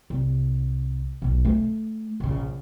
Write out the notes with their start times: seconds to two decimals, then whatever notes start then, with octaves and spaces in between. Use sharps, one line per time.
0.10 C2
1.22 B1 B2
1.45 A3
2.20 A#1 C#3